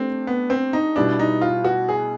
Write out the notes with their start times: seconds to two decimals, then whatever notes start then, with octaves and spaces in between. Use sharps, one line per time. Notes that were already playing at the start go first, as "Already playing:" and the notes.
Already playing: A3 C4 D4 G4
0.27 B3
0.50 C4
0.73 D#4
0.96 B2 G3 B3 D4 E4
1.19 D#4
1.41 F4
1.64 F#4
1.89 G#4